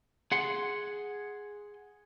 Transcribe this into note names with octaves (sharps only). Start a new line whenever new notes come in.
G#4 F#5 C6